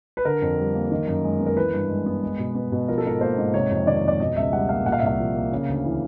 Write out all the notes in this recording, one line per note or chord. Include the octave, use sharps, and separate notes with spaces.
B4
D3 A#4
F2
G3
A#3
D#3
F#2
G#3
B3
A#4
E3 B4
G2
G#3
B3
G#3
B2
B3
B2
F3 A#4
A4
G#2 A#4
A#3 C5
G#2
C3 C#5
F2
D#3 D5
C#5
F2 D5
B2 D#5
C#2 E5
G3 F#5
A#3 F5
A#2 F#5
F5
E5
C2 F5
F3
A#3
C#3
D2
E3